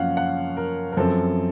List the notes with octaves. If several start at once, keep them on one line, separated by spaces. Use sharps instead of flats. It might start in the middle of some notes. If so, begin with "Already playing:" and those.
Already playing: F#2 F3 A#3 C#4 F5 F#5
F#5
A#4
A#4
F#2 F3 C4 A4